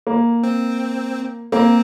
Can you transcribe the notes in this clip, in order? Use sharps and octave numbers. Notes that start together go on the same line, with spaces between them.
A#3
C4
A#3 C4